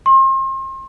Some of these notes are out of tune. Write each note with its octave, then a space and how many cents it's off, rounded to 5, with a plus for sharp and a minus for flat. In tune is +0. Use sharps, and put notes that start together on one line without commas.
C6 +35